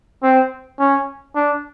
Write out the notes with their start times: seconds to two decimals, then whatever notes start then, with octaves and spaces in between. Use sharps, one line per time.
0.23 C4
0.79 C#4
1.35 D4